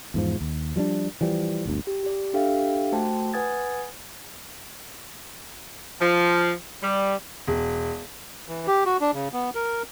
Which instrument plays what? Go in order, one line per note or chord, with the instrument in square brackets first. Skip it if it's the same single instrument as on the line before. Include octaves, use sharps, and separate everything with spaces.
[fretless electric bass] E2 G#2 F3
D#2
F3 G3 C#4 D4
E3 F3 G3
G1 D2
[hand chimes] G4
G4 D5
D4 G4 A4 E5 F5 G5
A3 F#4 C5 G5 A5
B4 F#5 G#5 D#6 G#6 A6
[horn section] F3
G3
[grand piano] E1
[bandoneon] E3
G4
F#4
D4
C#3
B3
A#4